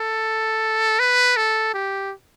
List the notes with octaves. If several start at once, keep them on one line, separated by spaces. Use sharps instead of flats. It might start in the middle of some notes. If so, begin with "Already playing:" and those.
Already playing: A4
B4
A4
G4